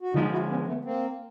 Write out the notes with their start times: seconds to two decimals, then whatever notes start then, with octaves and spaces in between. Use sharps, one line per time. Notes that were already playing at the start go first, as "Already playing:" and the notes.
0.01 F#4
0.13 D3 F3 G#3 D#4 F4
0.32 E4 F#4
0.49 B3 C#4
0.67 A3 B3
0.85 A#3 C4